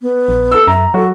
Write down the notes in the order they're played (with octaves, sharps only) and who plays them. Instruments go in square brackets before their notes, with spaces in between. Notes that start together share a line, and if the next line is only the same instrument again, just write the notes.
[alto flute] B3
[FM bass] A#1
[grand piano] A4 E6
[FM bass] F#2 [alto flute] E5 [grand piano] A#5
[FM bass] F#3 [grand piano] F#4 [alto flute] A4